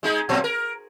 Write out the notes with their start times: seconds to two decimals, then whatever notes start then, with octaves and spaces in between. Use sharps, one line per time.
0.03 G#3 D#4 G#4
0.29 A#2 F#3 C4
0.44 A#4